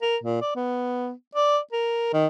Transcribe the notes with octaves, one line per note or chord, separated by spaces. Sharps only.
A#4
A#2
D5
B3
D5
A#4
D#3